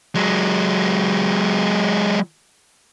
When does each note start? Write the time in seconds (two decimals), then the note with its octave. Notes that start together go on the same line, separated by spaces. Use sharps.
0.15 F#3 G#3